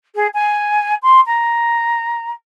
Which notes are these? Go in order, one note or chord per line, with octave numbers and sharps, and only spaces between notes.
G#4
G#5
C6
A#5